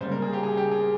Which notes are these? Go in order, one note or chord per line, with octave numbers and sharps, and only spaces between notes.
C#3 G3 A#3 C5
A#4
G#4
G4
G#4
G4
G#4